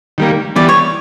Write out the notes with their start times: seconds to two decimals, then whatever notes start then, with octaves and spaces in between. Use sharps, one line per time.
0.18 D#3 G3 A#3
0.56 E3 G3 B3 D5
0.69 C#5